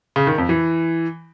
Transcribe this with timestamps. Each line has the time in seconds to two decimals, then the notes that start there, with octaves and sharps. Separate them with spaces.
0.16 C#3
0.27 D#3
0.38 F2
0.49 E3